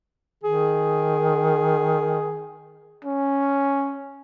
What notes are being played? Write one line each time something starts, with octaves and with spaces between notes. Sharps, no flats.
D#3 G#4
C#4